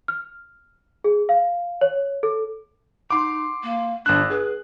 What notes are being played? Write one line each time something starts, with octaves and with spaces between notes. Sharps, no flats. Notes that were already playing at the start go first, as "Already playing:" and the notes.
F6
G#4
F5
C#5
A4
D#4 F#5 C6 D6
A#3
G1 D4 F#6
G#4 B4